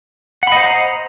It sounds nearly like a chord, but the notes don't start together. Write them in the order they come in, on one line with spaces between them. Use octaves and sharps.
F#5 B5 D#5 C5 A#5